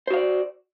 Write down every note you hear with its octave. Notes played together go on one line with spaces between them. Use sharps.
F#4 C5 D5 F5